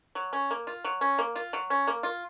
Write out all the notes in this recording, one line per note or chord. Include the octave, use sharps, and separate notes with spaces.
F#3
C#4
A#3
F4
F#3
C#4
A#3
F4
F#3
C#4
A#3
F4